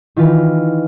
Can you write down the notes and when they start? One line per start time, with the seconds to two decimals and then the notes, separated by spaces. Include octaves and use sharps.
0.16 D#3 E3 F4 B4